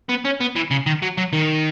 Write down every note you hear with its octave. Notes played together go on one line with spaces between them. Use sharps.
B3
C#4
B3
E3
C#3
D#3
F#3
F#3
D#3